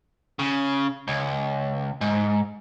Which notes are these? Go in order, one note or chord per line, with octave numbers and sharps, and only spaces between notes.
C#3
C#2
G#2